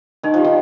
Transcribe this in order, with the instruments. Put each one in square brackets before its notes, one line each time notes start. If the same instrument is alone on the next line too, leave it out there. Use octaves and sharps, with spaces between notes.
[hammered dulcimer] D#3 [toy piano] D#4
[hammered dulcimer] F3
[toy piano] G4
[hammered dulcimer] D#3